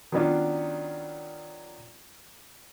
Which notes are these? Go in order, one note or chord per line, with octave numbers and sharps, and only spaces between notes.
D#3 F#3 B3 C#4 D4 F4